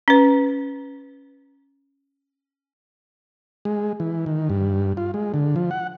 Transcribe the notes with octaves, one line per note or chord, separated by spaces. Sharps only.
C#4 B4
G#3
E3
D#3
G2
F4
G#3
D3
F3
F#5